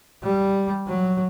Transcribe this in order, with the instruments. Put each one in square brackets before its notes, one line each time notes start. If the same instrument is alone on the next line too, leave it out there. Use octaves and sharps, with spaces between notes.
[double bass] G3
F#3